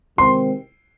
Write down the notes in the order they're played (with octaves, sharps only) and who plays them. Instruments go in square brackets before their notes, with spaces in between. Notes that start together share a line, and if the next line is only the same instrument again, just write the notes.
[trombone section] C3 D#3 G#3 C4 [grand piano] C6